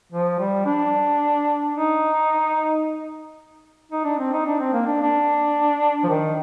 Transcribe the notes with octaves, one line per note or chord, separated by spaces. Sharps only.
F3
G3
D4
D#4
D#4
D4
C4
D#4
D4
C4
A#3
D4
D4
F3
D#3